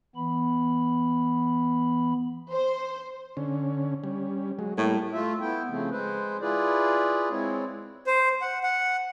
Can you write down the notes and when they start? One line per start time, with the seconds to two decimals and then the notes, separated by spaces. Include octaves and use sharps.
0.16 E3 B3 B5
2.51 C5
3.37 D3 C#4
4.04 G3 C#4
4.59 F#3 G#3
4.78 A2 G3 A#3
5.13 A3 F4 E5
5.41 B3 E4 G5
5.68 C#3 F3 A3 C4
5.91 G#3 B4 C5
6.41 E4 F4 G#4 B4 D5
7.31 G#3 C4 E4 C#5
8.07 C5
8.42 F#5
8.63 F#5